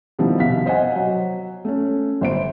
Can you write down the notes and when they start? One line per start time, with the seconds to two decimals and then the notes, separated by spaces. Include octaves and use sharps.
0.19 B2 D#3 F3 G3 E4
0.39 F1 B2 E5 F5 B6
0.66 C5 D#5 F#5 G#5
0.95 F#3
1.65 A3 C#4
2.21 G1 C5 D7